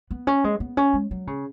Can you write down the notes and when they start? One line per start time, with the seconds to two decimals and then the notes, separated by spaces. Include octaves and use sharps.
0.11 B3
0.27 C#4
0.44 G#3
0.60 B3
0.77 C#4
0.93 G#3
1.11 F#3
1.27 C#3